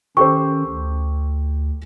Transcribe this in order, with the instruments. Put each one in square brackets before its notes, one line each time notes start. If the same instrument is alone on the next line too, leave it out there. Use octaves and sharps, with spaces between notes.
[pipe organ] D#3 C#4 [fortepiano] G4 A4 C5 [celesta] C#6
[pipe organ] D2